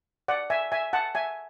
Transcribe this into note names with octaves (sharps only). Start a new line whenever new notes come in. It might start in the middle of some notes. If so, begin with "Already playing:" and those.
D5 F#5
E5 G#5
E5 G#5
F#5 A5
E5 G#5